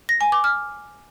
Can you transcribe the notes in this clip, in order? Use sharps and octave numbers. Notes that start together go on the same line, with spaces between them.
A#6
G#5
D6
F6